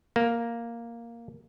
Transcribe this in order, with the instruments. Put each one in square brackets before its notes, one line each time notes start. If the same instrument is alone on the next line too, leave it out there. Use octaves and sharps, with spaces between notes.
[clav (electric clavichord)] A#3